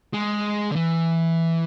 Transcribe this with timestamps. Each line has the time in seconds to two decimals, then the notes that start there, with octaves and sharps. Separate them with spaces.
0.14 G#3
0.72 D3
0.76 E3